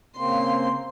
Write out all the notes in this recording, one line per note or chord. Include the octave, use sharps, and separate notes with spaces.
C#3 A#3 C4 C6